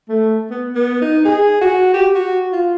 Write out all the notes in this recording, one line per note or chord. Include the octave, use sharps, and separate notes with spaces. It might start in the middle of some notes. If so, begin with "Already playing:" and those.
A3
B3
B3
D#4
G#4
F#4
G4
F#4
F4